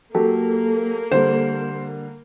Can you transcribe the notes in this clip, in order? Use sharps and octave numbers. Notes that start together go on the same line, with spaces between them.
F#3 A#3 G4 A4
D3 G3 C5